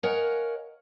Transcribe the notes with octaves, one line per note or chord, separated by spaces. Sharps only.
A#4 C#5 D#5 F5 F#5 G#5